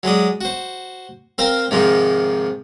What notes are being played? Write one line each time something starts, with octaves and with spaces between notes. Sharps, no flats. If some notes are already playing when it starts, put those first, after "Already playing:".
F#3 G#3 D5 D#6
F#4 C5
C4 A#4 C5 F5 G5
G#2 C3 D#3 F3 G#3